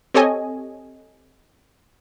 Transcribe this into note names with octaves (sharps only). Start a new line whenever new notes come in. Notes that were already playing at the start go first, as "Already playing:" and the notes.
C4 G4 A4 C#5 D#5 G#5